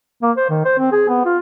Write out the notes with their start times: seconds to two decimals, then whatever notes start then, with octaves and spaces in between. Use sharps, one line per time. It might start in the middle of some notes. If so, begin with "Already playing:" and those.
0.23 A#3
0.37 C5
0.50 D#3
0.66 C5
0.78 C4
0.92 G#4
1.09 B3
1.25 F4